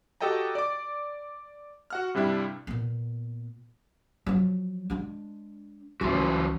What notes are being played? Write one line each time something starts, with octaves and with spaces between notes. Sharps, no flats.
F#4 G4 A4 D#5 G5 A#5
D5 D6
F#4 F#5 F6
G2 C3 G3 D4 E4
A#2 B3
F3 F#3
G#3 D4
C#2 G2 E3 F4 F#4